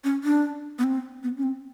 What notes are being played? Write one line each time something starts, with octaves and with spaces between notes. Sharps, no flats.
C#4
D4
B3
C4
B3
C#4
C4